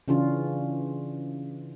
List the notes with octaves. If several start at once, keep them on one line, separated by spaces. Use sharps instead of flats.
C#3 E3 C#4 D4 F4